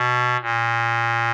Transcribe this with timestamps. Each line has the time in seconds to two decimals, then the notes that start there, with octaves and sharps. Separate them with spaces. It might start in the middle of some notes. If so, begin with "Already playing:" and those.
Already playing: B2
0.42 A#2